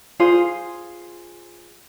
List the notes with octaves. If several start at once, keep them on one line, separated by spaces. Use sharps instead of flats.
F4 G#4 C5